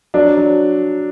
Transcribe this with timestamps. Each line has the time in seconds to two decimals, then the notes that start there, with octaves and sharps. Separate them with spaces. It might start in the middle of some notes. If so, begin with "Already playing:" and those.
0.14 F#3 D4
0.37 F#3